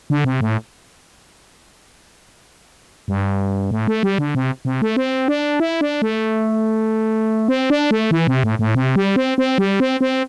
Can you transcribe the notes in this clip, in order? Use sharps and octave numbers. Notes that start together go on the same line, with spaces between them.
D3
C3
A2
G2
A2
A3
G3
D3
C3
C3
A3
C4
D4
E4
D4
A3
C4
D4
A3
E3
C3
A2
A2
C3
G3
C4
C4
G3
C4
C4